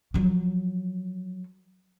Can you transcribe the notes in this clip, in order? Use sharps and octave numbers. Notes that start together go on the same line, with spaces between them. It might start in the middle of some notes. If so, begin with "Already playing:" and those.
F3 F#3